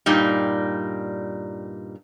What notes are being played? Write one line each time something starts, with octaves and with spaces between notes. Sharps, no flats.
G2 A#2 G3 D#4